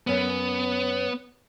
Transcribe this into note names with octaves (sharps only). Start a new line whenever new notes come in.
F#2 B3 C#4 G#5